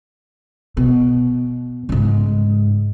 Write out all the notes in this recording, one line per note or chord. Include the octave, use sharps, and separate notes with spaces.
B2
G#2 C#3